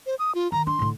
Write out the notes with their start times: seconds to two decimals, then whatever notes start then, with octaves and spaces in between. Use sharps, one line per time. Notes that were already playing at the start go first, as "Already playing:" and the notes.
0.06 C5
0.19 D#6
0.35 F4
0.52 D#3 A#5
0.67 D4 C6
0.79 A2 D3